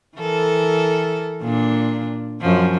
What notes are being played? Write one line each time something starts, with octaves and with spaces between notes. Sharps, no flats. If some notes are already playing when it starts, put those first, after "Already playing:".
E3 A4 A#4
A#2 D4
F#2 F3